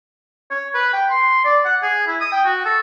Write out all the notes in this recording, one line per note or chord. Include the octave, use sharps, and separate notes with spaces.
C#5
B4
G5
C6
D5
F#5
G#4
E4
D#6
G5
F#4
A4